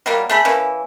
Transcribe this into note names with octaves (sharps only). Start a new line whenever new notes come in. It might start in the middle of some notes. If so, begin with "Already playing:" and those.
F#3 G3 A#3
A3 G#4 B5
E3 A#3 C#4